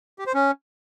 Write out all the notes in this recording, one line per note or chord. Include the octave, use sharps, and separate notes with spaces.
G4
C5
C#4